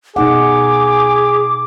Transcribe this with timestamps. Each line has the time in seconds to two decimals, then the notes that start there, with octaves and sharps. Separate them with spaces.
0.16 B2 D#4 G#4 F#5 D6